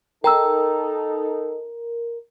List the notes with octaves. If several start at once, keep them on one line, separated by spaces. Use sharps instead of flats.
D#4 A4 A#4 G5 A#5 E6